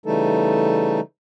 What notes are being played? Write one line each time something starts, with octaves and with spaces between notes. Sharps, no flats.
C#3 E3 G3 A3 D#4 A4